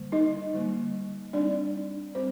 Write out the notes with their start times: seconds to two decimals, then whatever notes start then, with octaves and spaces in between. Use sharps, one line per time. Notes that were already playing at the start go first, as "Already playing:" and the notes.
Already playing: D3 G3 A#3
0.12 D#4 D#5
0.53 D3 G3 A#3
1.33 G3 C4 D4 D#4 D5
2.15 G3 C4 C5